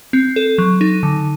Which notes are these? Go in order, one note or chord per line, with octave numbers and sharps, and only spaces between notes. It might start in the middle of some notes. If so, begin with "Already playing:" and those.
C4
A4
F#3
D#4
D3